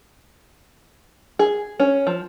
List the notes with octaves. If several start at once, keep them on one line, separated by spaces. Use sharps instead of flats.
G#4
C#4
F3